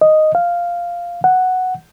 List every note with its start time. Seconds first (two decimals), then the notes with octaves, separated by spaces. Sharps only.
0.01 D#5
0.35 F5
1.24 F#5